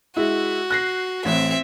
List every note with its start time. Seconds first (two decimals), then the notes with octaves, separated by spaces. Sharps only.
0.16 G#3 E4 F#4
0.70 F#6 A#6 C7
1.25 A1 C4 E5